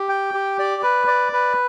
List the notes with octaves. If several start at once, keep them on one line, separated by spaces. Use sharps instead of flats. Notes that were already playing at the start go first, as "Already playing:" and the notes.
Already playing: G4
G5
G4
D5
B4
D5
B4